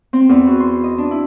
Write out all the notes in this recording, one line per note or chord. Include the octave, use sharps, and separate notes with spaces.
C4
E2
F#4
C6
D#5
D4
E4